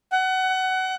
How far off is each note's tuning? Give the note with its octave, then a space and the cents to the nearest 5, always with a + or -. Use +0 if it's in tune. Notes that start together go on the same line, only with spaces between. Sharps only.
F#5 +25